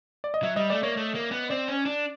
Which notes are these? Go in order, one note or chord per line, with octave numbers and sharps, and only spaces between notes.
D5
D#5
F#3 E5
G3 D#5
A3 D5
A#3 C#5
A3
A#3
B3
C4 D5
C#4
D4